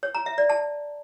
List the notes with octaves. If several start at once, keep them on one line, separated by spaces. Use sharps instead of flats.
C#5
A#5
E5
D5
A5